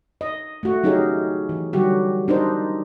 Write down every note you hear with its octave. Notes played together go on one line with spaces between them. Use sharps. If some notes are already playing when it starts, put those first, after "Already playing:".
D#5
A3 F#4
F#3 C#4 D#4 G4 G#4
E3
D3 F#3 G3 F#4 G4
D4 D#4 A#4 C5